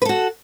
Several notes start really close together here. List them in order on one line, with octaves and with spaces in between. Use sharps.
B4 A4 F#4